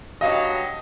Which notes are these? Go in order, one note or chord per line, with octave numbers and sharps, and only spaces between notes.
G2 F#3 D#5 F5 G5 D#6